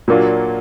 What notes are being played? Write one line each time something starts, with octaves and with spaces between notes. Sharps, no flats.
A#2 F#3 A#3 D4 F4